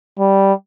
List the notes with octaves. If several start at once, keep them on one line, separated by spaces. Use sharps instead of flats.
G3